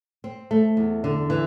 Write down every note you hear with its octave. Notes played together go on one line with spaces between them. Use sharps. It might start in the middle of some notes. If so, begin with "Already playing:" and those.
C4
A3
E2
D3
E3